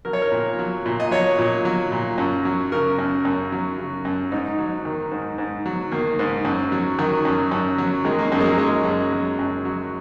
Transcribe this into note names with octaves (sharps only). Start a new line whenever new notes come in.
F#3 A#4
C#5
A#4
A#2
F#3
A#2
D#5
F#3 C#5
A#2
F#3
A#2
F#2
F#3
C#3 A#4
F#2
F#2
F#3
C#3
F#2
G#2 D#4
F#3
D#3
G#2
G#2
F#3
D#3 A#3
G#2
F#2
F#3
D#3 F#3
F#2
F#2
F#3
D#3 G#3
A#3
F#2 A#3
G#3
F#3
F#3 G#3
F#2
F#3
F#2
F#3